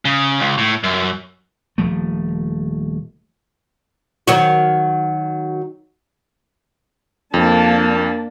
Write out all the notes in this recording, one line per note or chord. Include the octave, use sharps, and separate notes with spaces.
C#3
C#2
A2
F#2
D#1 F3 A3
D#3 F#3 F#4
F2 A#3 D4 A5